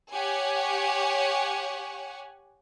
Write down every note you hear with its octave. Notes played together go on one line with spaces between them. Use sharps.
G4 C#5 F#5 G#5